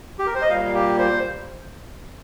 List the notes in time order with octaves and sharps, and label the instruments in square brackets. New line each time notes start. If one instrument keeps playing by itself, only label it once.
[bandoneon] G4
A#4
C5
D#5
A#2 G3 A#3 F5
G4
C5